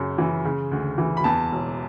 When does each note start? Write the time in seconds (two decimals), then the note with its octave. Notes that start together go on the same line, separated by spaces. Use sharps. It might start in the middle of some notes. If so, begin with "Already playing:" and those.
Already playing: F#2 C#3
0.18 E3
0.45 C#3
0.71 D2
0.98 E3
1.17 B5
1.24 E2 A5
1.52 E1